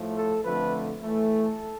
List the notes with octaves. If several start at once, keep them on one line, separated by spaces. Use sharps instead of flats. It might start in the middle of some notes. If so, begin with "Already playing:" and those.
Already playing: A2 F3 A3
A4
F2 D3 F3 A3 B4
A2 E3 A3
A4